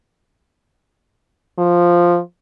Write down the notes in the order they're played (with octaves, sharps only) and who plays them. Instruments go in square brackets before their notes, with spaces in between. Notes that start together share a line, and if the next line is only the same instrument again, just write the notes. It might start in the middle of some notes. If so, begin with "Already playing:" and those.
[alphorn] F3